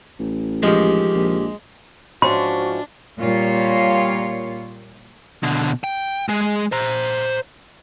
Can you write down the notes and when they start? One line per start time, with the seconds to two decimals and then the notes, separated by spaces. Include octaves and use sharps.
0.19 A1
0.63 D#3 F3 G#3 G4
1.15 A#1
2.22 G#2 F3 C#4 D4 F#4 C6
3.19 A#2 G3 F4 C#5
5.43 B2 D3
5.84 G5
6.28 G#3 G#4
6.72 C5 A#5